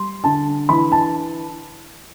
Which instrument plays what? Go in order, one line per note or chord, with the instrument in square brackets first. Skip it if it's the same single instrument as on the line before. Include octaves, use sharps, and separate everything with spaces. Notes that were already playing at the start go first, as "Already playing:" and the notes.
Already playing: [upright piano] G3 C6
D3 A5
E3 B5
A5